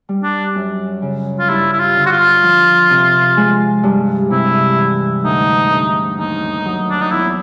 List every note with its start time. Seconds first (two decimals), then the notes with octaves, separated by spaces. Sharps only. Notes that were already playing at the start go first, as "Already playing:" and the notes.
0.09 G3
0.23 D4
0.55 F#2
1.02 C#3
1.39 F4
1.49 G2 E4
1.73 E4
1.80 F4
1.96 D3
2.06 F#4
2.12 F4
2.43 F3
2.90 C3
3.37 G#3
3.83 G2
4.30 C3 E4
4.77 E3
5.24 D2 D#4
5.71 D2
6.18 D#2 D#4
6.65 F#3
6.90 D4
7.02 D#4
7.11 E2 E4